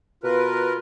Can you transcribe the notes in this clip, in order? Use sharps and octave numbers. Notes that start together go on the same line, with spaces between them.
B2 F4 A#4 B4